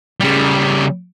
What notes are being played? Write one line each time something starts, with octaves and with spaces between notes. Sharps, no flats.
C#3 G3